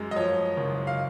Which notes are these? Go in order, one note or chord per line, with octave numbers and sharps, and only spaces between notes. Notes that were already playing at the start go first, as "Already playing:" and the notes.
Already playing: F#2 G#3
D#5
F3 C#5
F#1
F5